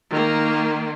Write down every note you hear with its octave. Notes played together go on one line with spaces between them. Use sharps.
D#3 A#3